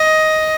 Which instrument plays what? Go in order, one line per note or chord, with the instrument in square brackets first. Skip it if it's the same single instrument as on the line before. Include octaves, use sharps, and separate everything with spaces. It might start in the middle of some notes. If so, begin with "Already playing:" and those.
Already playing: [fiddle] D#5